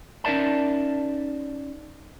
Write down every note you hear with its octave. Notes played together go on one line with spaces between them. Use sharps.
C#4 D#4 A#4 D5 E5 A5